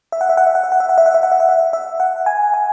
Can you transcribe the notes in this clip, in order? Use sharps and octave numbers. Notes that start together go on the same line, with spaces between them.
E5
F#5
E5
F#5
E5
F#5
E5
F#5
E5
F#5
E5
F#5
E5
F#5
E5
F#5
E5
E5
F#5
G#5
G#5